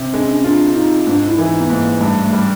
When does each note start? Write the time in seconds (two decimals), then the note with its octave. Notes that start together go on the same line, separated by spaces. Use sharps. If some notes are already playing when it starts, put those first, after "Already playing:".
Already playing: C3
0.13 G#3 D4
0.21 C#4
0.29 D4
0.36 C#4
0.44 D4 F4
0.75 D#4 F4
1.07 G#2 D4
1.28 E4
1.38 E3 D#4
1.60 B3
1.70 G#2 A#3
2.01 G2 A3
2.24 A3
2.33 G3